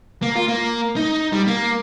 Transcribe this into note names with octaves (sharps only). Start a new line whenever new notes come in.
A#3
F4
A#3
D#4
G3
A#3